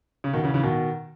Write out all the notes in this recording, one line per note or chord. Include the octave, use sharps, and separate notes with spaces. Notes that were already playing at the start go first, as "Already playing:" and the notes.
C#3
B2 D#3
C#3 E3
C#3 E3
B2 D#3